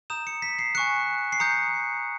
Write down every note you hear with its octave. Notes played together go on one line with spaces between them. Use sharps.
A#5 D#6 G6 E7
C#7
B6
C7
G#5 C#6 F#6 C#7
C7
A#5 D#6 G6 C#7